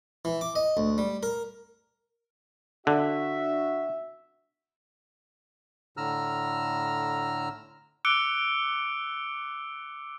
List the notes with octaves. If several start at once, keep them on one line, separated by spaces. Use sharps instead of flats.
E3
D6
D#5
D2
G3
A#4
D3 D4 F#4 E5
A2 D3 A#5 E6 F6
D6 E6 F#6 C#7 D7 G7